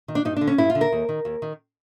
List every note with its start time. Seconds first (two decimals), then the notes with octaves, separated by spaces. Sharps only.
0.08 D#3
0.15 D4
0.25 G2 D#4
0.37 D3 D4
0.47 C#4
0.58 G2 E4
0.70 F4
0.75 D3
0.81 A#4
0.92 D#2
1.09 D#3
1.25 D#2
1.42 D#3